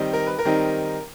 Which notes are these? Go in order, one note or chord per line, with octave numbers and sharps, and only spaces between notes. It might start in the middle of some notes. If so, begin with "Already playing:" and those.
Already playing: D#3 G3 C4 D#4
A#4
B4
A#4
D#3 G3 C4 D#4